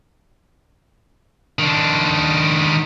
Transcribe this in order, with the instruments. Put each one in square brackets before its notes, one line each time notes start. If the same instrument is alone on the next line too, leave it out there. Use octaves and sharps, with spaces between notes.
[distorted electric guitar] D#3 D4